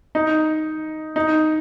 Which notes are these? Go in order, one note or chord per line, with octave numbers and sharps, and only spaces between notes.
D#4
D#4